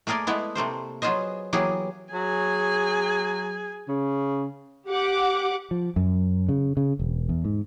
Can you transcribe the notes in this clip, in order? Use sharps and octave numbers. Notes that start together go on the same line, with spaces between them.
A3 A#3 G#4 A#4 D5
G#3 A3 B3 E4
C3 A3 A#3 C5
F#3 B3 F4 G#4 C5 D#5
E3 F#3 A#3 B3 G4 G#4
F#3 G#4 G#5
C#3
G4 F#5 D6
F3
F#2
C#3
C#3
E1
E2
G#2